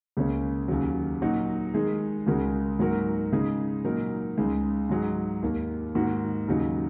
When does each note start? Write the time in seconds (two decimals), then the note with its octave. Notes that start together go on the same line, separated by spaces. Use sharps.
0.17 C#2 C#3 A#3 C#4
0.68 D#2 C#3 F#3
1.22 A#2 F#3 D#4 F#4
1.74 D#3 G#3 D#4 G#4
2.27 C#2 C#3 G#3 F#4 A#4
2.79 G#2 F#3 A#3 F#4 A#4
3.32 C#3 G#3 D#4 G#4
3.85 A#2 F#3 D#4 A#4
4.37 C#2 C#3 G#3 D#4
4.89 G#2 F#3 D#4 G#4
5.42 D#2 D#3 A#3
5.95 G#2 D#3 A#3 D#4 F#4
6.48 D#2 C#3 F#3 D#4